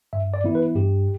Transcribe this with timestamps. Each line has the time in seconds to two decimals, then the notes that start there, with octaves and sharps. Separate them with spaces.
0.13 G2 E5
0.34 D5
0.44 E3 B3 E4
0.55 B4
0.75 G2 G4